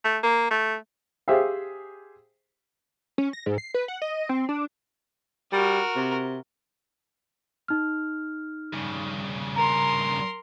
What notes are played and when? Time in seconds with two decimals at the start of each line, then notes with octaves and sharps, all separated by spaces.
0.04 A3
0.23 A#3
0.51 A3
1.28 G4 G#4 C5 E5 F5
3.18 C#4
3.33 A#6
3.46 G#2
3.58 C7
3.74 B4
3.88 F#5
4.02 D#5
4.29 C4
4.49 D4
5.52 G3 F#4 A#4
5.96 C3
7.68 D#4 F6
8.73 G2 C#3
9.56 A#4 A#5 C6